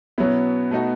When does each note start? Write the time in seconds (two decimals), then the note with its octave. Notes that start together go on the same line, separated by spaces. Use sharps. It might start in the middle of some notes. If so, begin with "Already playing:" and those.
0.18 B2 F#3 B3 C#4 E4
0.71 B2 A3 D#4 F#4